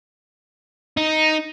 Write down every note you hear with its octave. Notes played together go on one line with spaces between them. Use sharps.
D#4